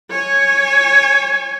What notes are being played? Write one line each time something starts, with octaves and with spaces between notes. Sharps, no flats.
C#5 G#5